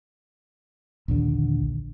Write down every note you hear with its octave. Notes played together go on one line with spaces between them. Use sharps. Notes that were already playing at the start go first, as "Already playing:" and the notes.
A#1 D#2 D3